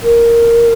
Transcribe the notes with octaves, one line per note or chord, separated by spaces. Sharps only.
A#4